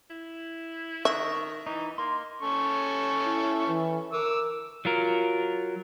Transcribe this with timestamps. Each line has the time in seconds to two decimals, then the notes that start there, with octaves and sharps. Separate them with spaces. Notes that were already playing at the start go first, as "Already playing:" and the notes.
0.10 E4
1.05 D#3 E5 C#6 F#6
1.66 E3 D#4
1.98 A#3 C6
2.42 C#4 A4 C#6
3.25 E4
3.68 E3
4.13 A#4 D6 E6
4.85 F#3 F4 A#4